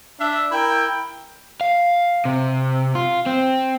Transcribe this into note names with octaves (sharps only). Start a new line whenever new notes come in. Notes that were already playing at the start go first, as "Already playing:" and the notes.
D4 E5
E4 A#4 G5
F5
C3
F4
C4